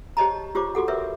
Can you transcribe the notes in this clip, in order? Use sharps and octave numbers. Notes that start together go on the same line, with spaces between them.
G4 C5 C#5 D#5 A5 A#5
F4 G4 C5 C#5 D6
F#4 G4 A4 F#5
A#4 B4 C#5 E5